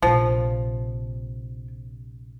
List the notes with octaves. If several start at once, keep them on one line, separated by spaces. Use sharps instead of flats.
A#1 C3 F3